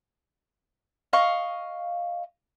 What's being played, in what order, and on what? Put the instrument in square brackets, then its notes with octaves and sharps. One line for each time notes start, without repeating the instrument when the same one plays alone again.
[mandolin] D#5 F5 C#6